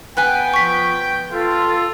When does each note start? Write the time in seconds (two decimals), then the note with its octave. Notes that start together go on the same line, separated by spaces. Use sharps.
0.17 B3 B4 G5 G#5
0.54 F3 C#6 B6
1.32 F4 A4